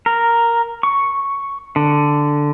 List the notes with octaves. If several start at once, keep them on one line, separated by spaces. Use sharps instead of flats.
A#4
C#6
D3